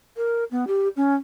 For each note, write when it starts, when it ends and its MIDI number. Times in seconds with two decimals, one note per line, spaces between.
0.16 0.44 70
0.51 0.65 59
0.67 0.88 67
0.96 1.15 61